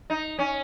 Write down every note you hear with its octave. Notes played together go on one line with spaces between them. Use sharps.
D#4
C#4